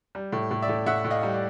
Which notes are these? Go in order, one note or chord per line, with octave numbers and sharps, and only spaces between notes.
G3
A2
A2
D5 E5
A2
A2 E5 F#5
A2
D#5 F5
G3
D5